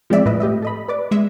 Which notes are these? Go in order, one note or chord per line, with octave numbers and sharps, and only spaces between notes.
F3 G#3 C4 D5 E5
A2 B4 D#5 E5
A3 G4 D#5 E5
A4 D#5 B5
B4 D5 D6
G#3 E5